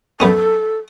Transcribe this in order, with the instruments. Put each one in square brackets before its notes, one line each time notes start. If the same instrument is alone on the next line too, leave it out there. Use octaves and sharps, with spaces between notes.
[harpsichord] F#2 B3 C#4 [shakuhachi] A4